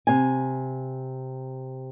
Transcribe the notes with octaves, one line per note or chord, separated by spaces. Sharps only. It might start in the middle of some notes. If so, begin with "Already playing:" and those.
C3 G#5